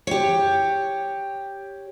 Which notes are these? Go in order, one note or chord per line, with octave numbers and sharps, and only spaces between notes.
G4 C#5